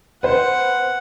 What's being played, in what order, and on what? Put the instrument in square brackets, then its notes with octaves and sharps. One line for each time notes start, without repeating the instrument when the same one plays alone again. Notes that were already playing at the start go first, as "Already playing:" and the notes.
[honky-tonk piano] B4 C5 [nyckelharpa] F#5